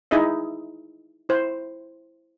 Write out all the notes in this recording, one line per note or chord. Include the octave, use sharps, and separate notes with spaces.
D#4 E4 G#4 D#5 E5
E4 C5